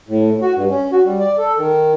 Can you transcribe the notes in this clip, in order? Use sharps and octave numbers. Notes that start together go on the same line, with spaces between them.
A2
F#4
G2
C#4
F#4
G3
D5
A4
D#3